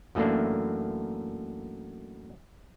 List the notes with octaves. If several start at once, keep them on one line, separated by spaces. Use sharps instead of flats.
F#2 E3 A3 A#3 D4